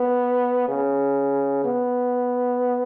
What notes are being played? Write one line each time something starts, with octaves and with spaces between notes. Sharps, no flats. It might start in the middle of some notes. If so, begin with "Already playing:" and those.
Already playing: B3
C#3
B3